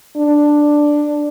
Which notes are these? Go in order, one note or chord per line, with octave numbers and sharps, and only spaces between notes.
D4